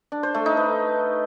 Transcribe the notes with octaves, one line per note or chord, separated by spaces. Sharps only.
D4
C5
A3
D#4
B4